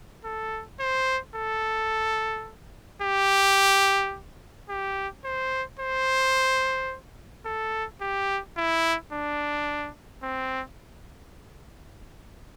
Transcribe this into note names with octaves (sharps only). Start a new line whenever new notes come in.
A4
C5
A4
G4
G4
C5
C5
A4
G4
E4
D4
C4